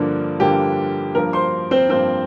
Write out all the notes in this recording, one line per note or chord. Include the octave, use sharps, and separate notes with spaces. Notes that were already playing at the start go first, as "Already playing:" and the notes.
Already playing: G2 D3 F3 A#3 D4
G2 D3 F3 A#3 D4 G4
G2 F3 A#3 A#4
C5 C6
C4 C5
G2 F3 A#3 C4 C5